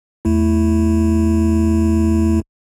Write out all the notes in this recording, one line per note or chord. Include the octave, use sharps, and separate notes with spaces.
E2 A3 E4